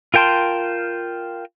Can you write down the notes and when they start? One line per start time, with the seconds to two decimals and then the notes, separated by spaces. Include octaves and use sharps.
0.14 F4 A#4 G5 A5 C6